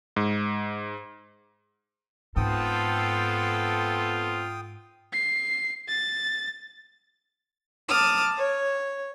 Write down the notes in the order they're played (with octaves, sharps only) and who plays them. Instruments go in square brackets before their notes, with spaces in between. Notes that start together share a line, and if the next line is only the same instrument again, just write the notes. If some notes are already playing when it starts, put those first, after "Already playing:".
[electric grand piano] G#2
[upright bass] G#2 [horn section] B3 C4 A4 [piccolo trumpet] F4 [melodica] G5 D#6
[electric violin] C7
A6
[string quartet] A5 D6 D#6 F6
C#5